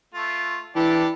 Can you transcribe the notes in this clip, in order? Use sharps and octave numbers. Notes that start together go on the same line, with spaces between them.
A3 F4
E3 D4 E4 G4 A4